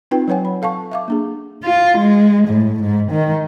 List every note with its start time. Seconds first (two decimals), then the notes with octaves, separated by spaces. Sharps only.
0.11 C4 D#4 F4 B4 G5
0.28 F#3 B4 C#5 F#5 G#5
0.45 B5
0.62 A4 F5 A5 C#6
0.92 E5 F5 D6
1.08 A#3 D4 G#4
1.64 F4
1.98 G#3
2.48 A2
2.83 G#2
3.11 D#3